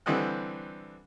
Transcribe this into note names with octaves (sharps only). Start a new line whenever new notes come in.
D3 E3 G3 C4 D#5 F#6